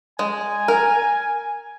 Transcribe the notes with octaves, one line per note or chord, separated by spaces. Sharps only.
G#3 G#5
A#4